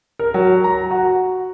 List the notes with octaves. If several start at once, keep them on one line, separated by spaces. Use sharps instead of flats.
A#4
F#3
A#5
F#4